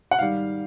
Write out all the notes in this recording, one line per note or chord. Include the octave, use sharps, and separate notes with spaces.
F#5
G#2 D#3 G3 F5